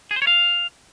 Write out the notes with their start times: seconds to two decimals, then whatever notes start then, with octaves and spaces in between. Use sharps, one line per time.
0.11 G#4
0.16 C5
0.22 C#5
0.27 F5